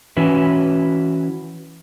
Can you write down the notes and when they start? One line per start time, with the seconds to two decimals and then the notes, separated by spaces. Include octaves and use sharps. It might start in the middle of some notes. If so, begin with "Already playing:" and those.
0.17 E3 C#4 E4 F#4 B4